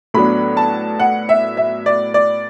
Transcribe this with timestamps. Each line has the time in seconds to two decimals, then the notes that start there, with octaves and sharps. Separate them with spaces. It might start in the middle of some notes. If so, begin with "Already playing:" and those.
0.14 A2 F#3 B3 D4 B5
0.57 A5
1.00 F#5
1.29 E5
1.57 E5
1.86 D5
2.14 D5